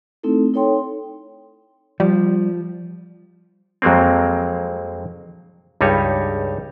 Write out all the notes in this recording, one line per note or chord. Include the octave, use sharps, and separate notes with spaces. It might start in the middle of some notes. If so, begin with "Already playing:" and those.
A3 C4 D#4 E4 A4
D#4 A4 C#5 G5 C6
F3 G3
F2 F#3 G#3 A#3 C4
C#2 G2 G3 D#4 C#5